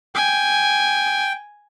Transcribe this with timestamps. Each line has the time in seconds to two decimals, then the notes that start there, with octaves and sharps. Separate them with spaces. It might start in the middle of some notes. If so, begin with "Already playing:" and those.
0.15 G5 G#5